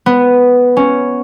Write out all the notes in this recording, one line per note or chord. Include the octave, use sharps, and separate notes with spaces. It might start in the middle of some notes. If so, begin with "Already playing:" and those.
B3
C#4